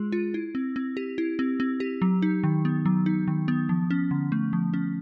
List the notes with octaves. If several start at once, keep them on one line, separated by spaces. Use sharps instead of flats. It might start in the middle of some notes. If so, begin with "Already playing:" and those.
Already playing: G#3 F4 G#4
F4
E4
C4
C4
G4
E4
C4
C4
G4
F#3
D#4
D#3
B3
F#3
D#4
D#3
B3
F3
C#4
D3
A3
F3
C#4